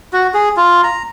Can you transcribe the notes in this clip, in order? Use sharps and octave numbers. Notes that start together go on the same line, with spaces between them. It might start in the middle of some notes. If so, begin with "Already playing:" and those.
F#4
G#4
F4
A#5